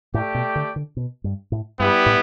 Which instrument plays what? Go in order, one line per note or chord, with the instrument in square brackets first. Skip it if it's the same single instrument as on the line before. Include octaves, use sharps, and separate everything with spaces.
[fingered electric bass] A2 [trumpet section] A3 G4 D5 G5
[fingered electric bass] B2
D3
D3
B2
G2
A2
[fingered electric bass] G2 [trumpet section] G3 B3 E4 G4
[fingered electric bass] A2